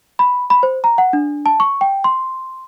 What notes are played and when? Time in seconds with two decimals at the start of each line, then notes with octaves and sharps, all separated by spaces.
0.19 B5
0.50 B5
0.63 C5
0.84 A#5
0.98 F#5
1.13 D4
1.46 A5
1.60 C#6
1.81 G5
2.04 C6